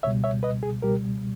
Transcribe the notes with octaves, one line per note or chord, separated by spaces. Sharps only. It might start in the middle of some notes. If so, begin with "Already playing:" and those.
C#2 B2 G3 C#5 E5
C#5 E5
B4 D#5
G#4
C#2 B2 G3 G4 A#4